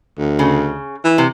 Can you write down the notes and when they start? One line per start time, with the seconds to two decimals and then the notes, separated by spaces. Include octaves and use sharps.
0.19 D2
0.39 C#3
1.04 E3
1.18 C3